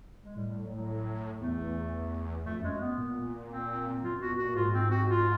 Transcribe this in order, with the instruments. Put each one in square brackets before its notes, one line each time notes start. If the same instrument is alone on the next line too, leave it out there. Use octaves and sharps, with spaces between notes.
[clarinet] G#3
[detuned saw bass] A2 [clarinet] G3
[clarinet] G3
F#3
F#3
[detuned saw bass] E2 [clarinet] A3
[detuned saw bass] F2 [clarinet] A3
[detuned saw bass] F#2
[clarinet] G#3
B3
[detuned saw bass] A#2
[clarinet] C4
[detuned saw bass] F#2 [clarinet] F4
[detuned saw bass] B2 [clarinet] F#4
[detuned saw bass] A#2 [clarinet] F#4
[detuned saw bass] G#2 [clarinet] F4
[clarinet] C4
F#4
F4